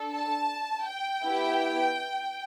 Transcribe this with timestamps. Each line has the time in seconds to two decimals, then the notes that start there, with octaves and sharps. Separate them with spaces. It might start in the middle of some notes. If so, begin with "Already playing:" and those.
Already playing: D4 A4
0.12 A5
0.88 G5
1.25 B3 E4 G4